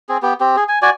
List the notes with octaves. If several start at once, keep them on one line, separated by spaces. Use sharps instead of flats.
C4 G#4
B3 G4
C4 G4
G#4
G#5
F#4 D5 G#5